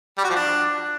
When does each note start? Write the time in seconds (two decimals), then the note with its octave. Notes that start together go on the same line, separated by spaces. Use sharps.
0.18 G3
0.24 F#4
0.30 F3
0.36 D4